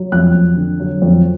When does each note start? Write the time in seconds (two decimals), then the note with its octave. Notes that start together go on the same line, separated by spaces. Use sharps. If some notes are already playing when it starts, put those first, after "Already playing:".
Already playing: F#3
0.12 F2 F#6
0.34 F2
0.57 D3
0.80 F#3
1.02 F2